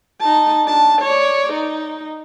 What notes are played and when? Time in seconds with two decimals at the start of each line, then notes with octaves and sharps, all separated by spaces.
0.21 D#4 A5
0.64 D4 A5
1.02 C#5 D5
1.53 D#4